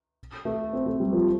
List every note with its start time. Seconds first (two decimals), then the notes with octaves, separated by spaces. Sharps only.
0.45 A3
0.73 C4
0.86 A3
1.00 G3
1.13 F3